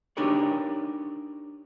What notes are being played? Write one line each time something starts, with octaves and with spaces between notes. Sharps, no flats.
D4 D#4 G4 A#4 C#5 D5